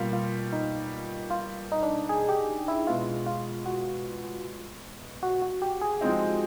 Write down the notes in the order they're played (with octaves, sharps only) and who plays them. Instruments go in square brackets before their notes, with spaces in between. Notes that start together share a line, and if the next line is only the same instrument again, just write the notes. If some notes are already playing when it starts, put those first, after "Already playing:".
Already playing: [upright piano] B2 G3 A#3 [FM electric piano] F4
[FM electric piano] F4
D#4
F4
D#4
D4
G#4
G4
E4
[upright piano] B2 G#3 B3 [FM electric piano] F4
[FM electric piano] F4
F#4
F#4
F#4
G4
G#4
[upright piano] F3 G#3 C4 D#4